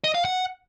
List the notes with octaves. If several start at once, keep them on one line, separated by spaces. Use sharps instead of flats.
D#5
F5
F#5